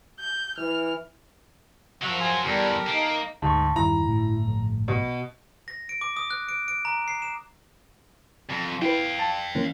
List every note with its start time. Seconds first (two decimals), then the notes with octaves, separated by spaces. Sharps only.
0.20 G6
0.58 E3 F6
2.02 F3 F#3 F#4 A#4 E5
2.20 G#4 C5 G#5
2.45 E2 G3 G4 A4 A#4
2.88 A#3 D#4
3.42 D2 G#2 A5 C#6
3.76 E2 G2 D#3 E4 A#5
4.05 G1 A2
4.47 A#1
4.88 B2
5.68 A#6
5.89 D7
6.01 D6
6.16 D#6
6.30 F#6
6.49 D7
6.68 D7
6.85 A#5
7.08 C7
7.22 E7
8.49 F2
8.82 E4 B4 F5 G5
9.19 A5
9.55 E3 A#3 C#4